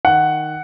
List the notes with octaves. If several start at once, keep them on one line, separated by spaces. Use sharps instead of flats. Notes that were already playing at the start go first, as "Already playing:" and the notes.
D#3 F#5